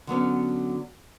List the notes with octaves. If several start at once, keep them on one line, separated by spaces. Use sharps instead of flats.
D3 F#3 B3 C#4